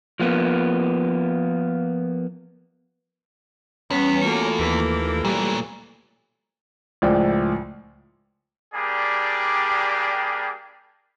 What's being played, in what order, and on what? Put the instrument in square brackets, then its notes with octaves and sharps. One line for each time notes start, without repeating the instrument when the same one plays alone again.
[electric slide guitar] F3 A#3 B3
[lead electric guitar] E2 [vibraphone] G3 B4 [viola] B3 [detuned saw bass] C#4
[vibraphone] A3 F4 A4 [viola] A#3 F#4
[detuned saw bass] D#2 [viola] E3 A#3
[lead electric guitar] A#2 F#3 [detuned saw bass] G3
[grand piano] C#2 A2 F3 D5 G5
[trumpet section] G3 A#3 D4 G4 G#4 D5